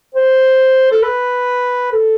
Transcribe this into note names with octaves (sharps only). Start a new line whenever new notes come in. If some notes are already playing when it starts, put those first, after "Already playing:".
C5
A4
B4
A4